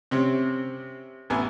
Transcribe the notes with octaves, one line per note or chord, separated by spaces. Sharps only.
C3 C4 C#4
A1 B3 E4 G#5